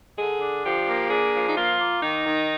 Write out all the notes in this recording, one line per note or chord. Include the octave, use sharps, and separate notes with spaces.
D3 G#4
D4
F3 G4
A#3
D4 G#4
F3
D#4
A#3 F4
A#3
D#3 D#4
D#3